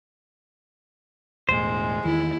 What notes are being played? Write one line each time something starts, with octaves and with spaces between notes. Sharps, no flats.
E1 A2 G#3 C5
E2 D#3 E4